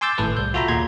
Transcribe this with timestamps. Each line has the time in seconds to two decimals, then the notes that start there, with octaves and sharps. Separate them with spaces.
0.01 G#5 C6 D6 E6 G6 A6
0.18 G#1 A2 A4 B4
0.37 C2 G6
0.54 F4 F#4 A4 E5 A#5 B5
0.68 D#2 A#2 G#4 A#5 C6 G#6